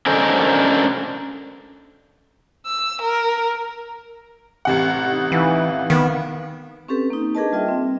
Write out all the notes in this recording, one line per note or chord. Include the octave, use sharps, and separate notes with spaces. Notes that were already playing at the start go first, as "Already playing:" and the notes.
C#4 D4 A4 A#4 C5 D#5
E6
A#4
A1 C3 F#5
D#4
E3 D#4 B4 F5
D#3 B3
C4 C#4 G4 A4 B4
A#3 D#4
D4 G#4 A#4 B4 D#5 A5
G3 F4 D#5 E5 G5
C4